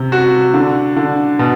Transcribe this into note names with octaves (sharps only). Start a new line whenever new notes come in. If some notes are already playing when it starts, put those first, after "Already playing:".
Already playing: C3
F#4
D3
D3
B2